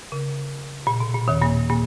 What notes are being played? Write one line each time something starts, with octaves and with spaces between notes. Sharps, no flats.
C#3
A#2
B2
A#2
D#2 D#3
A#2 A#3
A#2 A#3